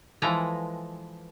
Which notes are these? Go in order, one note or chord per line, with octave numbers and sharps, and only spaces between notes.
E3 F3 G#3 A4 B4 A#5